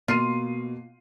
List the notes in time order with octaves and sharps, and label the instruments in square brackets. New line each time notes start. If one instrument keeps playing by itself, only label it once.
[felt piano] B2 C7 D#7 [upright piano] A#3 [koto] F4